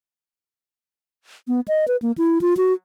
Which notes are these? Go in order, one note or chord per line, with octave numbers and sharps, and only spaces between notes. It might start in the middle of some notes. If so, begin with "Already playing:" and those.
B3
D#5
B4
A#3
E4
F4
F#4